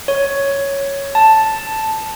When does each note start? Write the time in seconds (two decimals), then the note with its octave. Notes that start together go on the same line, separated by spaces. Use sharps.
0.08 C#5
1.15 A5